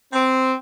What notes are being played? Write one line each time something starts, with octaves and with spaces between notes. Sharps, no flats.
C4